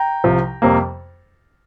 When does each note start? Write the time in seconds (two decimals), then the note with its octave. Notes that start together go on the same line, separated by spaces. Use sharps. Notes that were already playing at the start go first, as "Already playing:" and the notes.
Already playing: G5 A#5
0.24 C2 C3 F3
0.62 F2 C3 G3 A#3